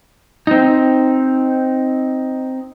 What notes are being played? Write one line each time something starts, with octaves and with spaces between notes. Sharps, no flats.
C4 D#4